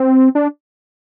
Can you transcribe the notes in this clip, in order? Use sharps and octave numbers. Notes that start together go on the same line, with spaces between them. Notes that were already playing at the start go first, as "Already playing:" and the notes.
Already playing: C4
D4